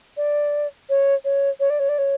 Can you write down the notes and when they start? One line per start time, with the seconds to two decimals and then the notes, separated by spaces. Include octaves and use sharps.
0.17 D5
0.89 C#5
1.25 C#5
1.60 C#5
1.70 D5
1.80 C#5
1.89 D5
1.98 C#5